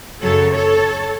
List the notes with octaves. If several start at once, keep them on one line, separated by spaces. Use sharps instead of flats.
F#2 C#3 F#3 A4 C#5
A4 C#5